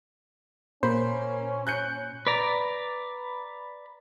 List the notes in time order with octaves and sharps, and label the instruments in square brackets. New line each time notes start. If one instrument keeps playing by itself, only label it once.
[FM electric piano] A#2 [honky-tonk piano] A#3 [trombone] C#4 [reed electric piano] C5 B5
[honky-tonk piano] F#6 G6 C#7
[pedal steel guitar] B4 D5 A#5